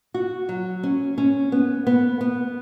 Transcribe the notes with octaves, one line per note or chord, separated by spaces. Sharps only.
F#4
F#3
C#4
C#4
B3
B3
B3